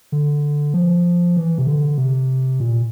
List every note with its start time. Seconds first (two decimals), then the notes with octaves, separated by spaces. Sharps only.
0.12 D3
0.74 F3
1.37 E3
1.58 C3
1.67 D3
1.98 C3
2.60 A#2